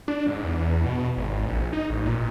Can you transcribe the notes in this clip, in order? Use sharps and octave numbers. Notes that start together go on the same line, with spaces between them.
D4
G#2
E2
B2
G#1
A#1
D#4
A1
A#2